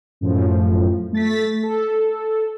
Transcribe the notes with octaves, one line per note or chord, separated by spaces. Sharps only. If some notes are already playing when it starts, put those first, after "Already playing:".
F#2 A2 F3
A3 A6 B6
A4